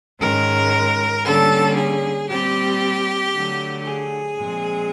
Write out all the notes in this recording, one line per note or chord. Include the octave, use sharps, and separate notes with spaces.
G#2 D#3 G#3 C#4 A#4
D3 G3 A#3 C#4 A4
G#4
A#2 G3 C4 G4
D3 F#3 A3
G#4
A#2 F3 G#3 C4